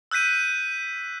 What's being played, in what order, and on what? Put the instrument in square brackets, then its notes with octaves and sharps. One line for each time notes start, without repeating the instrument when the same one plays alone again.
[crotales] E6 F#6 G6 B6 D#7